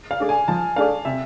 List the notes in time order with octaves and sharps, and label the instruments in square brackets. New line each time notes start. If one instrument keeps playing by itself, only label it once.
[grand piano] F5
[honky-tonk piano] A3 D4 G#4 D5
[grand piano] G#5
[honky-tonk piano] F3 [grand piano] A5
[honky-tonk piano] A3 D4 G#4 D5 [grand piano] F5
[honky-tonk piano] C3 [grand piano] E5